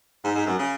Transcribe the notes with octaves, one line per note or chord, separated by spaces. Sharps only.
G#2
G#2
F#2
C#3